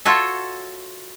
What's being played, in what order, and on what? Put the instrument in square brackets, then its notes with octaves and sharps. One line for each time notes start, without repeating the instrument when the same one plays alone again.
[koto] F4 F#4 A4 C#5 E5